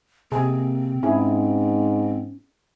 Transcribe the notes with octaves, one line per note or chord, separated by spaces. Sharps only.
C3 A#3 C4 G#4
G#2 C#4 E4 G#4